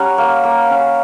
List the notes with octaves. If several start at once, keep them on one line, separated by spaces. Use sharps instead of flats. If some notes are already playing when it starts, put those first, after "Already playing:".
Already playing: G3 C#4 F#5 A#5 C#6
A#3
A#3
C#4